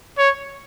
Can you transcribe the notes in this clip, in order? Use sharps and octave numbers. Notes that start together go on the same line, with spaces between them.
C#5